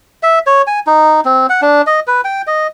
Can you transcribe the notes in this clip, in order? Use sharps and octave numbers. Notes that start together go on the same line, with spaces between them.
E5
C#5
G#5
D#4
C4
F#5
D4
D#5
B4
G5
D#5